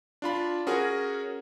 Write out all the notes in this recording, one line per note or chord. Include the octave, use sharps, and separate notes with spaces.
D4 F4 B5
C#4 F#4 G#4 A#4